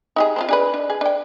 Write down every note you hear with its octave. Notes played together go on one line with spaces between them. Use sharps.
D#4 G4 G#4
C4 D4 F4
D4 G#4 B4
D4
G#4
D4 G5